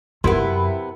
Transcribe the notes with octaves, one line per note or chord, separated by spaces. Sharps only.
F#2 C3 B3 E4 A#4 C6